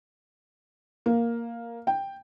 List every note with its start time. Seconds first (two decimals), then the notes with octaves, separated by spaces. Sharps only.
1.06 A#3
1.87 G5